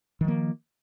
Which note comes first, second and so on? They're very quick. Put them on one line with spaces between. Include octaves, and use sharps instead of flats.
D#3 F3 A#3